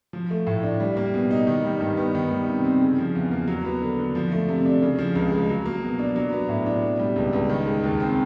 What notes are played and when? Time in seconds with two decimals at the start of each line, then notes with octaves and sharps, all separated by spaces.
0.13 F3
0.30 A3
0.47 A2
0.63 D4
0.80 G3
0.97 A#3
1.14 B2
1.31 D#4
1.47 D#3
1.64 G3
1.81 G2
1.97 B3
2.15 D#3
2.31 G3
2.48 C3
2.64 C4
2.81 C#3
2.98 F3
3.15 E2
3.31 A#3
3.48 F#3
3.65 B3
3.82 D3
3.99 D3
4.15 F3
4.32 A3
4.49 C3
4.66 D4
4.82 C#3
4.99 F3
5.15 C#2
5.32 G#3
5.49 F#3
5.66 A#3
5.82 B2
5.99 D4
6.16 F#3
6.32 B3
6.49 A2
6.66 D4
6.82 B2
6.99 G3
7.16 C#2
7.33 C#2
7.49 D#3
7.67 G#3
7.84 D#2
8.00 C4